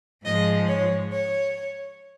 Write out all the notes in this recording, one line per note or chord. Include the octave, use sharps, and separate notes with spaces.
G#2 F3 G#3 D#5
C#5
C#5